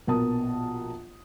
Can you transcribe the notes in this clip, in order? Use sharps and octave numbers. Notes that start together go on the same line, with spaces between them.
A#1 B2 B3 A#4 A5 D#6